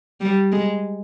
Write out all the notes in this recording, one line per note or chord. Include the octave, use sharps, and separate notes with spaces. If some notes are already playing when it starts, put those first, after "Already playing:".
G3
G#3